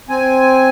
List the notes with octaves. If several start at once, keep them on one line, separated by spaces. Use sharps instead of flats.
C4 G#5